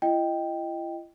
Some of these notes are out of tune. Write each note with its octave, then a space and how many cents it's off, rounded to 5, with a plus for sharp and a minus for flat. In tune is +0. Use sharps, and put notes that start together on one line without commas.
E4 +45 D#5 +0 G5 +0